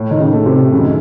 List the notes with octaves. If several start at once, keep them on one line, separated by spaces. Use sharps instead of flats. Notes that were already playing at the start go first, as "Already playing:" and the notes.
Already playing: A2
D#3
C#3
A3
C3
F#2 C#3
D#3